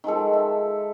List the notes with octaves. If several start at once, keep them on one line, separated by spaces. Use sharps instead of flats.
D#3 F3 G#3 A4
E5